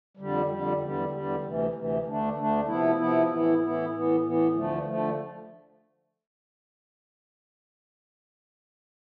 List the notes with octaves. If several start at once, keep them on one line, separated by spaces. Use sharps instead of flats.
F2 D3 G3
F2 D3 G3
E2 D3 G3
E2 D3 G3
D2 C3 E3
D2 C3 E3
D2 D3 A3 D4
D2 D3 A3 D4
C3 F3 B3 E4
C3 F3 B3 E4
A2 E3 B3 E4
A2 E3 B3 E4
A2 E3 B3
A2 E3 B3
D2 D3 F3 A3
D3 F3 A3